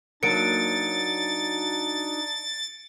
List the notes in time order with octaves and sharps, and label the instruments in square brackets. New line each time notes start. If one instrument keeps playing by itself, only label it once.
[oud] F#3 A#3 [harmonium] D4 D#4 [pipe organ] A6 [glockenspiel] C#7 D7